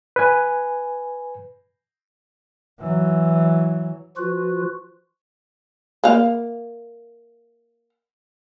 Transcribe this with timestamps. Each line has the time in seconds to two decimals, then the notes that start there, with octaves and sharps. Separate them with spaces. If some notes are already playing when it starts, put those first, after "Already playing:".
0.16 B4 G#5
2.79 E3 F#3
4.17 F3 F4 F#4 B4
6.04 A#3 F5